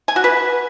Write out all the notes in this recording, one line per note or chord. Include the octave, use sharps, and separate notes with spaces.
G#5
F#4
B4